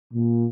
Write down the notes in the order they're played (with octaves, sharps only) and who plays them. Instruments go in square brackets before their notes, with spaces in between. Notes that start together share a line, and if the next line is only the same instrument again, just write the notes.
[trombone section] A#2